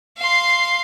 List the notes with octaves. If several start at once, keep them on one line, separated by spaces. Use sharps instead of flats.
F5 C6